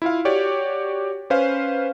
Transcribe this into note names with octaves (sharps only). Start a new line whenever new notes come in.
E4 F4 F5
F#4 G4 C#5 D5
C#4 B4 C5 F5